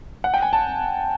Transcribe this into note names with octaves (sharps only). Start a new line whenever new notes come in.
F#5
G5
G#5
A5